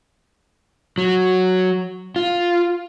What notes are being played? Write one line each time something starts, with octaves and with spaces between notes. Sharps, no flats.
F#3
F4